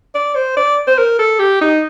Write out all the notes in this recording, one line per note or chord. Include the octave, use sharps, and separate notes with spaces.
D5
C5
D5
C5
A#4
A4
G4
D#4